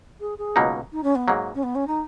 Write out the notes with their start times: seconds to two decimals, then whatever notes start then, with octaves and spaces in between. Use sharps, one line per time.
0.20 G#4
0.38 G#4
0.56 C#2 B2 F#3 A#3 D#4
0.92 D#4
1.03 C#4
1.15 B3
1.28 G#2 F#3 A#3
1.54 C#4
1.63 B3
1.75 C#4
1.87 D#4